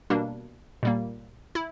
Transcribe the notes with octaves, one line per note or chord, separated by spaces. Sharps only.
B2 G3 A#3 D4
A#2 G3 A#3
E4